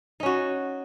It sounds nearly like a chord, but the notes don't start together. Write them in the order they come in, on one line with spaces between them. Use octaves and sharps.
D#4 C#4 F#4